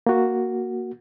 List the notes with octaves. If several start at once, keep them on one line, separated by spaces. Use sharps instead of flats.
A#3 F#4